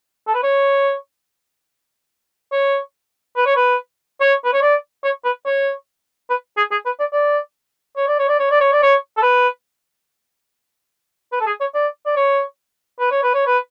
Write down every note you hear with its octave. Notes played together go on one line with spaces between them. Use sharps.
A4
B4
C#5
C#5
B4
C#5
B4
C#5
B4
C#5
D5
C#5
B4
C#5
B4
G#4
G#4
B4
D5
D5
C#5
D5
C#5
D5
C#5
D5
C#5
D5
C#5
A4
B4
B4
A4
G#4
C#5
D5
D5
C#5
B4
C#5
B4
C#5
B4